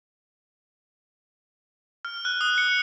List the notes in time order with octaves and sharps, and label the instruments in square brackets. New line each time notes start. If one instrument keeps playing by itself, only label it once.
[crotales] F6
F#6
D#6
C#7